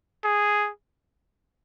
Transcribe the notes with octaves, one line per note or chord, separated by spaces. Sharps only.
G#4